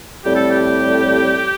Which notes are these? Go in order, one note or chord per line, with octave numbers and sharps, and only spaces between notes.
A2 G3 C4 G4
A4
G4